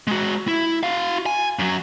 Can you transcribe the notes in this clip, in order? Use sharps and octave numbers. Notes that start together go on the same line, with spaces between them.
G#3 F#4
E4
F#4 F5
G#5
F#2 F#3